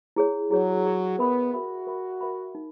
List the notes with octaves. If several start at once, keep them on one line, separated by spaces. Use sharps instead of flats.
E4 G#4 C#5
F#3 E4 G#4 C#5
E4 G#4 C#5
B3 A#4 E5 B5
F#4 A#4 E5 B5
A#4 E5 B5
A#4 E5 B5
D#4